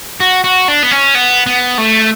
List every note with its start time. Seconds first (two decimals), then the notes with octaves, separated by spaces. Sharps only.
0.20 F#4
0.44 F#4
0.68 D4
0.83 B3
0.91 C#4
1.15 B3
1.47 B3
1.78 A3